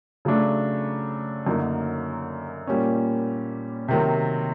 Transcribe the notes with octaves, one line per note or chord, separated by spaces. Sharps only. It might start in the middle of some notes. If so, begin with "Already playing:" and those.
C#3 F#3 A3 D4
F#2 D3 F#3 A#3 D#4
A#2 G3 A#3 C#4
C3 D#3 F#3